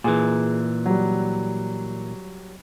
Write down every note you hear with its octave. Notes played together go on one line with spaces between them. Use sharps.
A#2 E3 G#4
F#3 G3